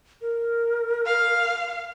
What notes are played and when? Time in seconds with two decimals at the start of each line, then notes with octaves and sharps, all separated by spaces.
0.21 A#4
1.06 F5